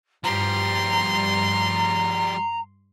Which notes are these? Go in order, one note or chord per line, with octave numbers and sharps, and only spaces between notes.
G2 F3 G3 A#5 C6